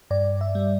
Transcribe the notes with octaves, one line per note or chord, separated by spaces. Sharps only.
G2 D5
E5
G3